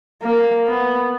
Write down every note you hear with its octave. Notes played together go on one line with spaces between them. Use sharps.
A#3
B3